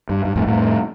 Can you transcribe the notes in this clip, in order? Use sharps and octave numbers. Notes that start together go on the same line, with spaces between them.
G2
G2
F2 A2
F2 A2